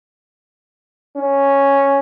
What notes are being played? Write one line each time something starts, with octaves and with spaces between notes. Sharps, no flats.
C#4